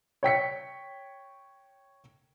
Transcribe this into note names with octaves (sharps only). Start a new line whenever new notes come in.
C#5 G5 B6 C#7